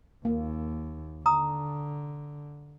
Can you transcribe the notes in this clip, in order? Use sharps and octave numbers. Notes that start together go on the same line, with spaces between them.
D#2 A#3
D3 A#5 D#6